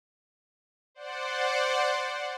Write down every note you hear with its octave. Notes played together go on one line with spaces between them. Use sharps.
C5 D5 F#5